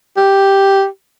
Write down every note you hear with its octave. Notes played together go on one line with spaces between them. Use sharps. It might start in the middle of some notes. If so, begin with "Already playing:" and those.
G4